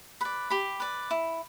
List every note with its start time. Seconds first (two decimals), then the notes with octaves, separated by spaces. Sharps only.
0.21 B4 D5 B5
0.50 G4 B5
0.80 B4 D5
1.11 E4